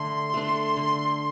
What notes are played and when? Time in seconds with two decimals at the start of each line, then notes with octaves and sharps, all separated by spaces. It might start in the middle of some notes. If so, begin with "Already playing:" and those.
Already playing: D3 A3 D4 C6
0.34 A3 D4
0.77 D3